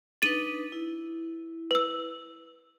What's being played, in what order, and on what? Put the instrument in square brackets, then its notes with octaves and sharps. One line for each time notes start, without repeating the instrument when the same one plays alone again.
[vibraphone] D4 D#4 B4 [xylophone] A6 D#7 F#7
[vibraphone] E4
[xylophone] B4 E6